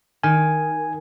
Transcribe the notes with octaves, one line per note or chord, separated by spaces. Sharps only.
D#3 G#5